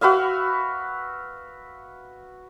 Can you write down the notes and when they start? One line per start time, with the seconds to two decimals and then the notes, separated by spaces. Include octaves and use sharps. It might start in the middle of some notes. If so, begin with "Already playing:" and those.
0.01 F#4 B4 E5 F5